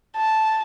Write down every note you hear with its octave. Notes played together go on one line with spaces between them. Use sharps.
A5